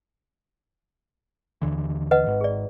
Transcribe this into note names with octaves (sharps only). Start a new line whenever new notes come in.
D#2 D3 E3
B4 D#5 F#5
G#1 G#2
G#4 D5